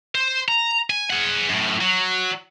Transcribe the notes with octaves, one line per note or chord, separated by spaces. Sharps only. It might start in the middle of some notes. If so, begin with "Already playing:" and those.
C5
A#5
G#5
G#4 F#5
F#2 A2
F#3